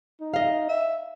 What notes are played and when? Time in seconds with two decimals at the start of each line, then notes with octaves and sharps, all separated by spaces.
0.21 D#4
0.34 D#5 F5
0.69 E5